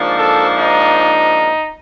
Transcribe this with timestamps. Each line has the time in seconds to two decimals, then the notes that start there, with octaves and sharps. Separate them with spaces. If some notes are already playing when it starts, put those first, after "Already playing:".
Already playing: G#2 F3 A#3 D4
0.18 A4
0.57 D#4